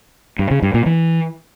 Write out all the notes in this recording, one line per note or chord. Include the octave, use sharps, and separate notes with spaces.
G2
C#3
G2
A#2
E3